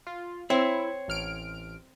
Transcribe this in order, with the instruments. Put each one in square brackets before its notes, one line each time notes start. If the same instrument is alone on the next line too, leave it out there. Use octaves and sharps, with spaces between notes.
[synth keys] F4
[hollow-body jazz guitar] C4 [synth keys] E4 [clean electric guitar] C#5
[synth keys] A1 F6 D7